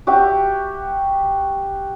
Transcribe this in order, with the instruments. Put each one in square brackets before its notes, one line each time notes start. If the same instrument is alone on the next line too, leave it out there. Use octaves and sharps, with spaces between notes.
[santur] F#4 G4 E5 G5